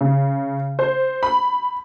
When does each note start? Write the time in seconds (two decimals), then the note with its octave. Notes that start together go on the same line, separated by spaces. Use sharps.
0.01 C#3
0.79 C5
1.23 B5